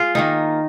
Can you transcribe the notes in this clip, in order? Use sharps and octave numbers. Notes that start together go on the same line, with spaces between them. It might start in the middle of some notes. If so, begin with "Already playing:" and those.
Already playing: F4 G#4
D#3 A#3 D#4